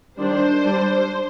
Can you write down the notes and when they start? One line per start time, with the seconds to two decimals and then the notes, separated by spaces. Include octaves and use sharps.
0.19 D#3 G3 D4 C5
0.62 G3 D4